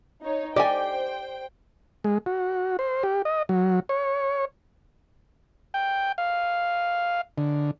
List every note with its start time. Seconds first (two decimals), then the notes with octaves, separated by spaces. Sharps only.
0.23 D#4 C#5
0.56 G4 C5 D5 D#5 G5 G#5
2.04 G#3
2.26 F#4
2.79 C5
3.03 G4
3.25 D#5
3.49 F#3
3.89 C#5
5.74 G5
6.18 F5
7.38 D3